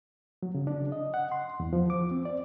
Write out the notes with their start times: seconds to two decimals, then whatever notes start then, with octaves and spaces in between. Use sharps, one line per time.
0.43 F#3
0.55 C#3
0.67 D4
0.92 D#5
1.14 F#5
1.32 C6
1.60 E2
1.73 F3
1.90 D6
2.11 C4
2.25 D5